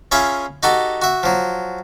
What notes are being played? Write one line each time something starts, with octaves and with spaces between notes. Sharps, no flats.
C#4 F4 G#4 E5 B5
D#4 F#4 G4 A4
F#4 E5
F3 F#3